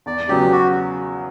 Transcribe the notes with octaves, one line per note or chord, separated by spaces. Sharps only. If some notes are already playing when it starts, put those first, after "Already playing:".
E2 D5
C#3 F#3 B3 G4
F#4